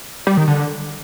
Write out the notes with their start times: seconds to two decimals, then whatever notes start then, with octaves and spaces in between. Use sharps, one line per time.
0.27 G3
0.37 D#3
0.48 D3